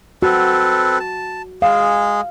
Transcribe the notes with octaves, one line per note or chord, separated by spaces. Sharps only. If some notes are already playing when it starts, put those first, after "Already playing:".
C4 F#4 A4 B4
A5
G#3 G#4 F5